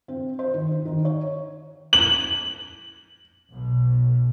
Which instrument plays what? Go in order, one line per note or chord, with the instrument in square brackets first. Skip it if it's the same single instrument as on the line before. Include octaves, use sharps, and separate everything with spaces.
[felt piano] C4
C5
D#3
D#4
D#3
C#5
[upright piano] F#7
[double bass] B1 B2